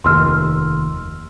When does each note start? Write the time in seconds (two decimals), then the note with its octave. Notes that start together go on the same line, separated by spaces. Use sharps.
0.04 F1 D#2 C6 E6 F6